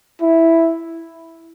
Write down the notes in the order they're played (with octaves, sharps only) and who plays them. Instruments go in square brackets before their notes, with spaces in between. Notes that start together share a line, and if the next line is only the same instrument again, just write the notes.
[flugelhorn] E4